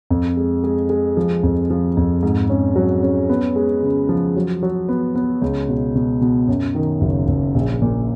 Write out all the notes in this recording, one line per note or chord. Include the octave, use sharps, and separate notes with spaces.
F2
G#3
G#3
G#3
F3
F2
F3
F2
G#2
C#4
F#3
C#4
B3
G#3
C#3
F3
F#3
F#3
B3
B3
C#2
B2
B2
B2
F#2
D#3
F#1
F#1
A#1
A#2